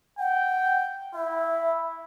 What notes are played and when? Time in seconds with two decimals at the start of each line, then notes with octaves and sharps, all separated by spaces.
0.19 F#5 G5
1.15 E4 E5